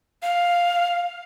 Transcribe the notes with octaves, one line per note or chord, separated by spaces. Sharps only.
F5